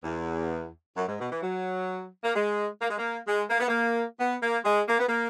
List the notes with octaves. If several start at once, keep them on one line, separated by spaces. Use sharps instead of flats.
E2
F#2
G#2
B2
E3
F#3
A#3
G#3
A#3
G#3
A#3
G#3
A#3
B3
A#3
B3
A#3
G#3
A#3
B3
A#3